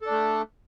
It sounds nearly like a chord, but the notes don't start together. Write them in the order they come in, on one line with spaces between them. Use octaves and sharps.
A4 D4 A3